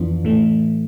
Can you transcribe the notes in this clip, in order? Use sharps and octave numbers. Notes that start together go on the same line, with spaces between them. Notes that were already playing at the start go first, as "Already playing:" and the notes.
Already playing: F2 E3 B3 D4 F4
A2 E3 A3